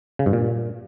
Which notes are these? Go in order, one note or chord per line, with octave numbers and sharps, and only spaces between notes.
C#3
G2
A#2